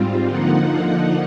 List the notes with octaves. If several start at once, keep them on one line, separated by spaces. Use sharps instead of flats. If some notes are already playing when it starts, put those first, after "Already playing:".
Already playing: G#2 G3 C4 F4
D3 F3 A#3 D#4 F#5